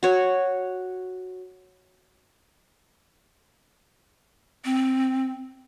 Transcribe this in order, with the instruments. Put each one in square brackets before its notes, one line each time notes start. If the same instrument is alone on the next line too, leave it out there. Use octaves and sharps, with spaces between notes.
[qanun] F#4 C#5
[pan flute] C4